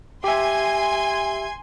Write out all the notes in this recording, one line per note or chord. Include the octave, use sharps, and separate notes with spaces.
G4 E5 G#5 C6 G#6